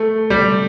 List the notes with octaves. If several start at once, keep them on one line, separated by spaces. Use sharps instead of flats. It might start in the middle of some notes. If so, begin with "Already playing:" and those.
Already playing: A3
G3